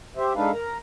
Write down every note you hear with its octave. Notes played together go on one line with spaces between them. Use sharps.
G4 C5 E5
G#3 D4 D#4 A4 B4 F5
A#4 A#5